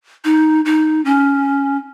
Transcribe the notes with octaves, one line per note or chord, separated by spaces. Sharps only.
D#4
D#4
C#4